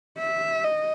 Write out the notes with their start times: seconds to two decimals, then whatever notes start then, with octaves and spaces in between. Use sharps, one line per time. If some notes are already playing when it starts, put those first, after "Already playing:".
0.18 E5
0.64 D#5